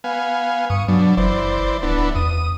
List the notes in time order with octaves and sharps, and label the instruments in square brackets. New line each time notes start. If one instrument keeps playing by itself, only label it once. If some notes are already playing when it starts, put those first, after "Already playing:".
[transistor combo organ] B3 F5 G#5
[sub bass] G2 [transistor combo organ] C#6 D#6
[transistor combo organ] B2 D4 [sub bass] F#3
[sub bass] F#1 [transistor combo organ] E3 C5 D5
[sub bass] D1 [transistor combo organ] E3 B3 D4
[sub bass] E2 [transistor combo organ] D#6